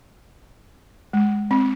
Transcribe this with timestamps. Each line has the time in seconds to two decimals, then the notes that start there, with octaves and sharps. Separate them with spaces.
1.13 G#3
1.51 C4